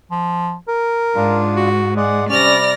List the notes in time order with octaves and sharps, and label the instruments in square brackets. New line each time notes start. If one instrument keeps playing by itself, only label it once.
[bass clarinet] F3
A#4
[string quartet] G#2 [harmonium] D4 F4
[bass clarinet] F#4
[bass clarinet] G#3 [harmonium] G#4 D5 F#5
[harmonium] C3 G3 [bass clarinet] C#4 [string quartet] D5 F6 A#6